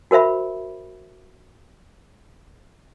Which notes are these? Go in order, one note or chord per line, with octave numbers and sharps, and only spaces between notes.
F#4 A#4 C5 E5 B5